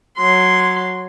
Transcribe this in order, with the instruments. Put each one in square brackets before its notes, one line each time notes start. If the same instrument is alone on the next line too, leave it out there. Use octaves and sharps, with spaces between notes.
[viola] F#3 C6